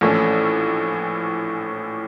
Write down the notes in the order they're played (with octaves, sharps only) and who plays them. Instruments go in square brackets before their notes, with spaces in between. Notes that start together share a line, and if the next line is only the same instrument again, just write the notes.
[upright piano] A#1 A2 E3 A3 C#4 [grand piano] A4